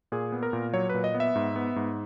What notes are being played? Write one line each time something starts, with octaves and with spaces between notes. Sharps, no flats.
A#2 G#4
B3
A#4
A#2
F#3 C#5
A#2 B4
D#5
B3
E5
G#2
B3
G#2